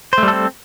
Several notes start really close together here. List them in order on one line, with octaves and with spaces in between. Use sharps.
C5 A3 G3 A4 C4